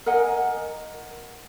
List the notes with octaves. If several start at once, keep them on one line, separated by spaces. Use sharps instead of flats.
A#4 D#5 F#5 G#5